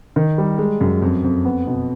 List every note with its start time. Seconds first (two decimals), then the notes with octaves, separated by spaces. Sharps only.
0.16 D#3
0.38 G3
0.58 G#3
0.81 F#2
1.02 F2
1.24 F2
1.45 B3
1.67 B2